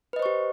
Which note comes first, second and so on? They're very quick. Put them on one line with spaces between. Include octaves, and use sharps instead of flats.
B4 D#5 C5 C#6 G4